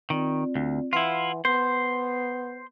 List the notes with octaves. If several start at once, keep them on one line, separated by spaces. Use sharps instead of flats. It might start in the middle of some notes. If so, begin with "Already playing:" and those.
D#3 C4 F4 D5
D2
E3 E4 F4 F#5 C6
B3 C5 C6